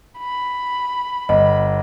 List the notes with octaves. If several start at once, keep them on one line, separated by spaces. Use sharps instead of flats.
B5
G1 D#5